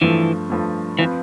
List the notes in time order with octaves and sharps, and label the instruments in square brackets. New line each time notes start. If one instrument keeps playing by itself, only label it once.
[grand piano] G2 F3 A3 [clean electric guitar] E3
[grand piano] G2 F3 A3
[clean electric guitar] E3 [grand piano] F3 C4 F4 B4